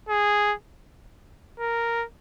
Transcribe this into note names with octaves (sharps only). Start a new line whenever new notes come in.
G#4
A#4